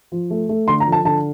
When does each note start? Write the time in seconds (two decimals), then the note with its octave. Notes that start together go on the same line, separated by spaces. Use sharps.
0.12 F3
0.30 A3
0.49 A3
0.68 D3 C6
0.80 A#5
0.86 F3
0.92 A5
1.05 D3 A5